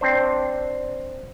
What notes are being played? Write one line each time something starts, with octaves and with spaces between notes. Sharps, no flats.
C4 D4 C5